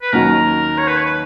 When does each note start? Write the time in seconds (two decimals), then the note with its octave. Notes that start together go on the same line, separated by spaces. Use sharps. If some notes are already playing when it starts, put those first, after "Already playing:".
0.02 B4
0.13 D#2 D#3 F#3 C#4 F#4 A#4
0.78 C#5
0.87 B4
0.97 C#5
1.05 B4